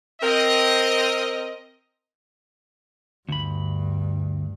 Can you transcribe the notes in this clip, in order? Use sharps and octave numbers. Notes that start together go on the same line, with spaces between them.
C4 A#4 D#5
D2 G2 B5